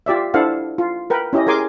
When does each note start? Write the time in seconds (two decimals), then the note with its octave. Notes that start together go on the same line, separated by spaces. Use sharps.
0.06 F4 G4 D5 E5
0.34 D4 E4 A4 C5 F5 F#5
0.78 F4
1.10 A#4 B4 G5
1.33 C#4 E4 G4 D#5
1.47 G#4 A#4 G#5 C6 D6